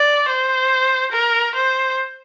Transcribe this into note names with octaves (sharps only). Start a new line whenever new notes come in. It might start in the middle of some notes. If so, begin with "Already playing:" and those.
Already playing: D5
C5
A#4
C5